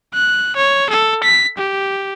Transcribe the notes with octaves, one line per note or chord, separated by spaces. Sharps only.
F#6
C#5
A4
B6
G4